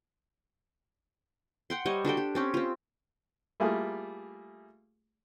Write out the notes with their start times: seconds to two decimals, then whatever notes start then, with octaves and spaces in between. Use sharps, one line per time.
1.70 F#5 G5 C6
1.86 G3 C5 C#5 D#5
2.05 D4 F#4 A4 G5
2.17 G4
2.35 C4 C#4 G4
2.54 C4 F4
3.60 G3 A3 A#3 E4 F4 G#4